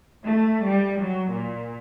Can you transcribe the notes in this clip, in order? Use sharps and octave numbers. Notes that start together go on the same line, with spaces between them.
A3
G3
F#3
A#2